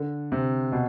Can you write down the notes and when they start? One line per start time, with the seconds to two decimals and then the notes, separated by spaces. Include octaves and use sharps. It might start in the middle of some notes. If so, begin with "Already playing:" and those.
Already playing: D3
0.32 C3
0.72 B2